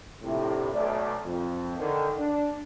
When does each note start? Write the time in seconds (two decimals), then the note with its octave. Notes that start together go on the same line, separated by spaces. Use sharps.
0.23 A#1 A2 C3
0.73 B1 A3 D5
1.25 F2
1.79 D3 D#3 G5
2.19 D4